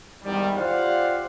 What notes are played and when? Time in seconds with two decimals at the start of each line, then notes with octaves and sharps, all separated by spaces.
0.23 E2 G#2 D#3 G3
0.56 F4 G4 C5 D5 F5 F#5